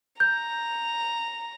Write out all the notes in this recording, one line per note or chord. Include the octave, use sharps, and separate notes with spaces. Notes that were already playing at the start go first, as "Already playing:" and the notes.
A#5 G6